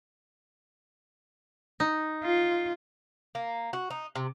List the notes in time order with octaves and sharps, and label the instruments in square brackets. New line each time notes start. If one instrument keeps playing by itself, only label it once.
[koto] D#4
[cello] F4
[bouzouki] A#3
F#4
D#4
C3